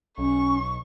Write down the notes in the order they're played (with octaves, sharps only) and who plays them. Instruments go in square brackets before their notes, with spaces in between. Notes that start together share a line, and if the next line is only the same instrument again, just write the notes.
[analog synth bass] B1 [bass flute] C#4 [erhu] C#6